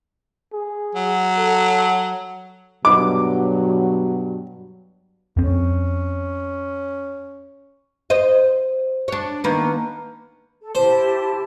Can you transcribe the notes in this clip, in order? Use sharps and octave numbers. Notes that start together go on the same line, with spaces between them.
G#4
F#3
A4
G2 B2 F#3 D6
F2 C4 C#4
C5 D#5
D4 C#5
D#3 A#3 B3
A4
E4 G4 C5 A5